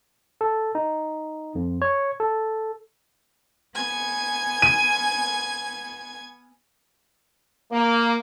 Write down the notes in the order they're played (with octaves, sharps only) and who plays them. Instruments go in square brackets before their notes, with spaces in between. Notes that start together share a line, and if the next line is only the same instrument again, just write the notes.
[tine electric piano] A4
D#4
F2
C#5
A4
[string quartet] B3 G#5 G#6
[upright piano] D#7
[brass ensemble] A#3